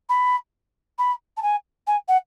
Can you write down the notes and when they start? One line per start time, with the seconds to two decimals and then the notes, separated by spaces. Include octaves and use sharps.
0.09 B5
0.98 B5
1.37 A5
1.42 G#5
1.87 G#5
2.08 F#5